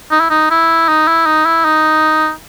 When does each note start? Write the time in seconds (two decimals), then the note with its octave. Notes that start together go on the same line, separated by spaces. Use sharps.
0.11 D#4
0.20 E4
0.30 D#4
0.51 E4
0.88 D#4
1.08 E4
1.26 D#4
1.46 E4
1.65 D#4